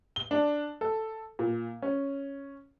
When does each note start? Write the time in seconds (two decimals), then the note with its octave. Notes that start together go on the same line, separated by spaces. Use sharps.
0.16 G7
0.31 D4
0.81 A4
1.39 A#2
1.82 C#4